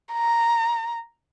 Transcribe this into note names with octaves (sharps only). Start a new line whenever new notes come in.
A#5